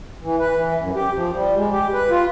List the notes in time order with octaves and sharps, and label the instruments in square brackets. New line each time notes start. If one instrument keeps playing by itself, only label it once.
[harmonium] E3
B4
E3
F#2
G4
F3
G3
G#3
G4
B4
F4